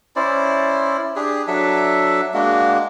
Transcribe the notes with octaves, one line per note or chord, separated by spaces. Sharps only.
C#4 E4 C5 D5
D4 G4 G#4
F#3 D4 A4 E5
G#3 A#3 D4 F#4